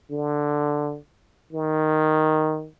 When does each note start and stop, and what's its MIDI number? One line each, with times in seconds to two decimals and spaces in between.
0.10 0.97 50
1.53 2.68 51